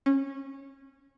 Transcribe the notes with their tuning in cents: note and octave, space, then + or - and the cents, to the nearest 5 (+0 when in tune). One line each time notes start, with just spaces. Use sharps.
C#4 -20